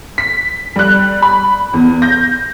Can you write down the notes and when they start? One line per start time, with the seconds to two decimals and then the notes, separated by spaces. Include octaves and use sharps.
0.18 B6
0.76 G3 F#6
1.22 B5
1.74 E2
2.02 G6 A#6